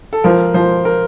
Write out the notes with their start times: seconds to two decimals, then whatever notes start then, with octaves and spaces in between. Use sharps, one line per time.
0.13 A4
0.24 F3 A#4
0.54 F3 C5
0.85 A#4